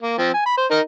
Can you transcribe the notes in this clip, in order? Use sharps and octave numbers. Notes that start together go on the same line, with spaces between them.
A#3
F3 C4
G#5
B5
C5
D#4 A#4 D#5